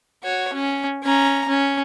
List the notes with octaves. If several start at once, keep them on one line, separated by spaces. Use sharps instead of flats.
F#4 C#5
C#4
C#4 A#5
C#4